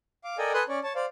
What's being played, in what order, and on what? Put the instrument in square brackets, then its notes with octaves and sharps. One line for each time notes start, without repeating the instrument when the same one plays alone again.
[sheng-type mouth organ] F5 D6
A4 A#4 D5 D#5 G5 G#5
A4 B4 G#5 C6 D#6 F#6
C#4 C#5 D5
C#5 A5
C5 D5 F5